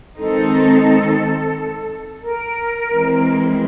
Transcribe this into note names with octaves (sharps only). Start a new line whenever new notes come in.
D#3 G#3 C4 D#4 A4
A#4
E3 G#3 C4